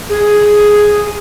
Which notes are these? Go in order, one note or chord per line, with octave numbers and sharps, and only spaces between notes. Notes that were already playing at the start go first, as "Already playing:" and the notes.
G#4